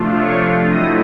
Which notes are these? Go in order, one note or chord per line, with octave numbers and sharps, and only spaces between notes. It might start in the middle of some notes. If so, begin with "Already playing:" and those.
Already playing: C3 F3 A3 D4 F4
C#5 C#6
F#3 A3 C4 E4 D#5 D#6